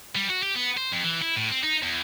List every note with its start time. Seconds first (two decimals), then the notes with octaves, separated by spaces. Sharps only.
0.15 G3
0.30 F#4
0.43 G4
0.55 B3
0.77 C5
0.92 F2
1.04 E3
1.22 E4
1.37 A2
1.51 C4
1.63 D#4
1.82 E2